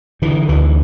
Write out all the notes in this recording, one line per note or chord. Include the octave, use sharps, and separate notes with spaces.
D3 E3
D2 E3